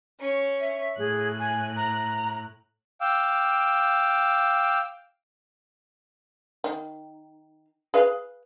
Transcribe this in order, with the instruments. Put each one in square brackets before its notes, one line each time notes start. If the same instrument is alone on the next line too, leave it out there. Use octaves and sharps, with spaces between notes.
[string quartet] C#4 C#6
[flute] E5
[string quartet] A2 F#6 [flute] G#4
[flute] G#5
A#5
[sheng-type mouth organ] F5 G5 D6 E6
[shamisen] D#3
G#4 B4 F5